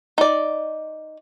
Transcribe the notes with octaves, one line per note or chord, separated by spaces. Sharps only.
D#4 D5